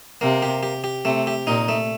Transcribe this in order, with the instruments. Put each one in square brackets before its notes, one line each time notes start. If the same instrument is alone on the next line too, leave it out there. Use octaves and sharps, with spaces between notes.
[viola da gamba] C3 [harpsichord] A#3
[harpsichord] G4
G4
G4
[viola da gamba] C3 [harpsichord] A3
[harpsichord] G4
[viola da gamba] A#2 [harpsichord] D#4
[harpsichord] A3